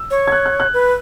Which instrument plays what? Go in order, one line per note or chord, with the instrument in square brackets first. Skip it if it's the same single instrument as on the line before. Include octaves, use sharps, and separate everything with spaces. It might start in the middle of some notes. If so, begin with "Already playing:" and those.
Already playing: [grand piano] E6
[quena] C#5
[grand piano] G#6
F#6
F#6
F#6
[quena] B4